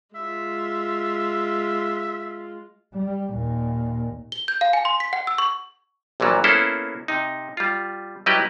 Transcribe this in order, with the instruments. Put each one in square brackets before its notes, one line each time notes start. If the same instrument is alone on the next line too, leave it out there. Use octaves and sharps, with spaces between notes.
[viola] G#3 F4 [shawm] E5
[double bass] G3
D#2 A#2
[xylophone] G7
G6
F5
G#5
C6
B6
F#5
E6
C#6
[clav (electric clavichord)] A#1 A#2 E3 F#3 G3
A#3 B3 C#4 E4 A4 C5
C3 D#4
G3 F4
F#3 G3 E4 G4 B4 D#5